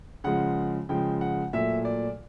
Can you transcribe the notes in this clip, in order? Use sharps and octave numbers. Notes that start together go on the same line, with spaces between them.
C#3 F3 G#3 F#5
C#3 F3 G#3 G5
F#5
A#2 F#3 A3 E5
D5